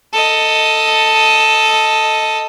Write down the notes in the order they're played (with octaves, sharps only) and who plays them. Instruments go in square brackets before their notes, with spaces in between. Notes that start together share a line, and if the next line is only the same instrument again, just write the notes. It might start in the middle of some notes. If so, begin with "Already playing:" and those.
[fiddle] A4 D#5